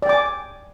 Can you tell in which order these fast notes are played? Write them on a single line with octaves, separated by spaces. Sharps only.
D5 G5 D6 G#5